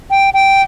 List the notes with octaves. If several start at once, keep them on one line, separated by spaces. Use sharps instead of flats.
G5
G5